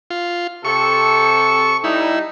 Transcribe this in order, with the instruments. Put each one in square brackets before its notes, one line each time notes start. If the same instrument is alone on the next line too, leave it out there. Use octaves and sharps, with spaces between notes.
[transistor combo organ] F4
[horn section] C3 A4 [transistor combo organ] C#6
[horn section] G3 D#4 [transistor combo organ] E4